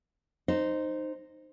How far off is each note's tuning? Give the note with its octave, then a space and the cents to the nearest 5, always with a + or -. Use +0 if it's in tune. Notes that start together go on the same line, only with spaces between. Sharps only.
D#4 -10 C5 +0